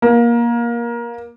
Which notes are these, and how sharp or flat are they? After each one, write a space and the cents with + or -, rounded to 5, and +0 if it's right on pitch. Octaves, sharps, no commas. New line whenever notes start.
A#3 +20